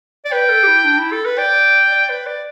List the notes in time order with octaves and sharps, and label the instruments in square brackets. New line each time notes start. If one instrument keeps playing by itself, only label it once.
[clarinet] D5
[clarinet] B4 [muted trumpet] G5
[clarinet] A4
G4
E4
D4
E4
A4
B4
[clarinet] D5 [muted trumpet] G5
[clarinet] D5
B4
D5